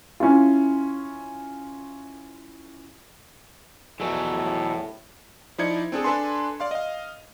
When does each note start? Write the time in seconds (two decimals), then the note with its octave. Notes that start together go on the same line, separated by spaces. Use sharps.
0.20 C#4 E4 F4
4.00 A#1 E2 B2 E3 F#3 A4
4.33 A2
5.58 F3 D#4 E4 D5 G#6 C#7
5.92 C4 D4 G#4 A4
6.04 D4 A4 B4 G#5 C6
6.60 D5 F5 C6
6.71 D#5 F5